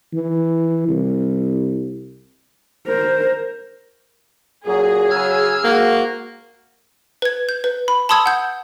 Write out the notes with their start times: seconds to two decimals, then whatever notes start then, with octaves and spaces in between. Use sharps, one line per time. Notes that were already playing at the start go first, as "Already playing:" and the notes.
0.13 E3
0.88 C2
2.87 A#4 C5
4.66 F#2 A#2 F#3 G#4
5.10 C#3 F#3 E6 F6 G#6
5.64 G#2 A#3 F#4
7.22 B4 G#6
7.49 G6
7.64 B4
7.88 B5
8.09 A5 B5 C6 D#6 E6 G#6
8.26 F#5 G6